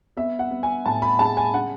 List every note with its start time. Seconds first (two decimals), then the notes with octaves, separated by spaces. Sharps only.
0.17 B3 E5
0.39 F#5
0.51 B3
0.63 G#5
0.86 A2 A5
1.02 B5
1.19 G#3 A5
1.37 G#5
1.54 C#3 F#5